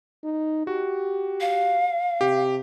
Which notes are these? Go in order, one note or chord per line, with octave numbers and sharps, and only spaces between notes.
D#4
F#4 G4
F5
C3 G4